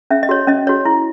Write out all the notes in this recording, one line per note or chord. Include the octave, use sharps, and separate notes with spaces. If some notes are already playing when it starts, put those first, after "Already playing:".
C#4 E5
D#5
F#4 C#5
C#4 D#5
F#4 C#5
E4